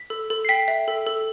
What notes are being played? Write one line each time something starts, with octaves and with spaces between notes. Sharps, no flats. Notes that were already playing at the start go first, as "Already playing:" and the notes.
Already playing: B6
A4
A4
C7
G5 B6
E5
A4
A4